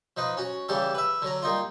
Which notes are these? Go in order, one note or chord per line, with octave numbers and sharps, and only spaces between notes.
F3 D#4 B4
C#4 F#4
C#3 E3 G3 G4 A4
B4 E5
D3 F#3 A#5
G3 A#3 D#4 F4